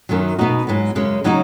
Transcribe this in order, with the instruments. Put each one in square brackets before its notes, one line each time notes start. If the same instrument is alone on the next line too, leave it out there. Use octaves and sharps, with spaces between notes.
[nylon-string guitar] F#2 D#3 F#3
B2 B3 D#4 F#4
G#2 F#3 B3
F#2 C#3 G#3
C#3 F#3 D#4 F#4